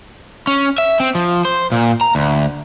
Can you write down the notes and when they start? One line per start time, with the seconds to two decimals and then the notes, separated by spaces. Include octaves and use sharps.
0.47 C#4
0.78 E5
1.00 C4
1.15 F3
1.45 C5
1.72 A#2
2.01 A#5
2.15 D2